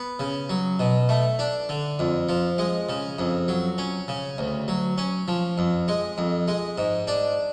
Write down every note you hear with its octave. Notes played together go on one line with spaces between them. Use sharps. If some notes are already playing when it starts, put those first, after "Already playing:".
Already playing: B3
C#3
F#3
B2
A3
D4
D3
F2
F3
G#3
C#3
F2
F#3
C#4
C#3
D2
F#3
C#4
F3
F2
G#3
F2
G#3
G#2
D4